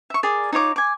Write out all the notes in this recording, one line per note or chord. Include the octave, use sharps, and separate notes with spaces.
E5 C#6
G#4 A#4 D5
D#4 F4 C#5 D6
G#5 D6